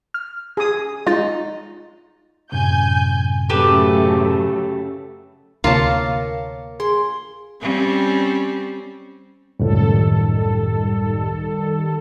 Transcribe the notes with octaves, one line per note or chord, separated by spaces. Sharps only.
F6
G#4 D#6
G#3 D#4 F4 A6
F#2 A2 C3 G#5 G6
C#3 F#3 A3 G4 A4 B4
D2 C3 A#3 F4 A#4 C#5 A5
G#4 C6
G3 C4 C#4
C#2 F#2 A2 D#3 G3 A4